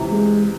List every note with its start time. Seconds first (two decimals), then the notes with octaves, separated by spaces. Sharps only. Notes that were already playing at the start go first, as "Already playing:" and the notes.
Already playing: C#2 C3 E3
0.12 G#3